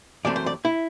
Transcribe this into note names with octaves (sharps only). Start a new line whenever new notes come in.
F#2 E3 A3 C4 D5
C5
D5
E4